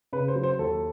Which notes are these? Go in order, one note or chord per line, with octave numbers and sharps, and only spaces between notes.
C#3 B4
C5
F#3
C5
D#2 A4